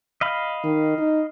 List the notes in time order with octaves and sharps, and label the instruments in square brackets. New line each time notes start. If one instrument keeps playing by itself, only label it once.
[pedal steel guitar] D#5 F5 B5
[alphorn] D#3
D#4